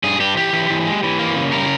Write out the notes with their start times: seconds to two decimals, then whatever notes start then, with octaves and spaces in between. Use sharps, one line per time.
0.04 G2 G#4
0.20 G2 G4
0.37 E3 G4
0.53 E3
0.70 E3
0.86 G#3
1.03 E3
1.19 A#3
1.36 C#3
1.52 G3 A#4